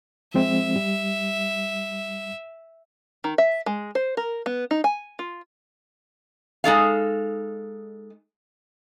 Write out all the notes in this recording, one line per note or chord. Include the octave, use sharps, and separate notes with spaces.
F3 G#3 C4 E5
G3
D#3
E5
G#3
C5
A#4
B3
D#4
G#5
F4
G#3 D#4 A4 F5